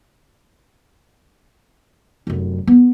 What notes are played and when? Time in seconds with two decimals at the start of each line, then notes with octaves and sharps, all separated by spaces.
2.27 F1 F#2
2.67 B3